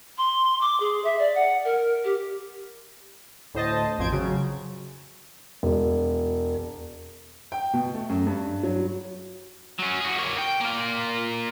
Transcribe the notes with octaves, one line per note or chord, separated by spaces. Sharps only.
C6
D6
G#4
E5
D5
F#5
A#4
G4
D2 A2 C5 D#5 A5
A1 F2 C5 G#6 D7
C#3 F#3
E1
G5
B2
A3
F#2
G2
F#3
F#3 C#4
F#4 G#4
A#3 C#5
G5
A#3 F4